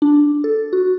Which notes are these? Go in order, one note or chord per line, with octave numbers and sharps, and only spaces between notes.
D4
A4
F#4